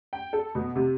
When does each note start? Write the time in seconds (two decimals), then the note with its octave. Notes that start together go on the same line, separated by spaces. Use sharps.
0.13 G5
0.33 A4
0.55 B2
0.76 C3